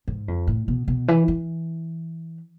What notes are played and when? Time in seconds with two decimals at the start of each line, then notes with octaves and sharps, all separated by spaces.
0.08 G#2
0.28 F2
0.47 A2
0.68 B2
0.88 B2
1.08 E3
1.28 E3